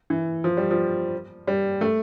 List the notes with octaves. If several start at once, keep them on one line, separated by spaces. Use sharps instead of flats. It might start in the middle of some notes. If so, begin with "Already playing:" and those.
E3
F3
G3
F3
G3
A3